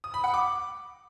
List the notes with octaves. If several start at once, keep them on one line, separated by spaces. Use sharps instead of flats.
D#6
B5
F#5
D6